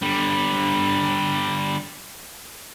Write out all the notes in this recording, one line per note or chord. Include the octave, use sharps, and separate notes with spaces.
D3 G3